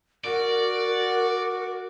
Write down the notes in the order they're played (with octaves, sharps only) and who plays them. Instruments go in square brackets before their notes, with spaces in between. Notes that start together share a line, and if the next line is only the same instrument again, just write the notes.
[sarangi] F#4 [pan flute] A#4 [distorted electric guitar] D5